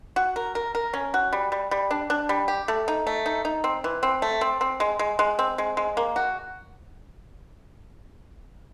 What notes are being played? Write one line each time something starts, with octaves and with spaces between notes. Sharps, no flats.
F#4
A#4
A#4
A#4
C#4
F#4
G3
G3
G3
D4
D4
G3
G4
A3
D#4
A3
D#4
D#4
C4
E3
C4
A3
C4
C4
G#3
G#3
G#3
C4
G#3
G#3
A#3
F#4